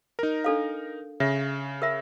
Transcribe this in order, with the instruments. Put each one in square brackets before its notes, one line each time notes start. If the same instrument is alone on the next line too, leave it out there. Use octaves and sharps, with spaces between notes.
[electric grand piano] D#4 A#4
[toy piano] D4 A4 F5
[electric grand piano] C#3 [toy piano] E5
[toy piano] A#4 E5 B5